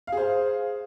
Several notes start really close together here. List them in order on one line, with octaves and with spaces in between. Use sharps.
F5 G#4 C5